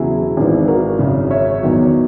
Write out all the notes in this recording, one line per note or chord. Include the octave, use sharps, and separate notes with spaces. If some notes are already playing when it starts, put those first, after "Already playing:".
Already playing: E1 E2 C#3 F#3 E4 G#4
G#1 G#2 E3
F#4 A#4
G#1 F#2 C#3
C#5 E5
E2 D#3 F#3